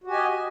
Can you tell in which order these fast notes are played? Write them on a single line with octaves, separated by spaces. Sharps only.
F#4 G4 G#5 D#5